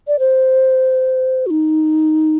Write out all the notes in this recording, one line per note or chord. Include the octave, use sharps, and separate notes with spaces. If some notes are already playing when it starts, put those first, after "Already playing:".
D5
C5
F#4
D#4